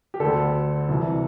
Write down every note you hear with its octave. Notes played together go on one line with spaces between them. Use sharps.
G4
D2 D3 A4
C2 C3 E3